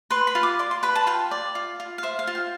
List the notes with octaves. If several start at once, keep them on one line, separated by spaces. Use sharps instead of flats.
B4 C6
B5
F4
D6
D5 C6
C6
B4 B5
A5
F4 G5
D5
F4
F4
F5
C5 E5
F5
F4
G5